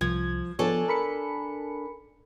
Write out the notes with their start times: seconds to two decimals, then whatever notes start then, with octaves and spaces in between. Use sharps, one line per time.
0.01 C2 F3 G#6
0.59 F3 B3 D4 A4 C#5 G#5
0.88 A#4 B5 C#7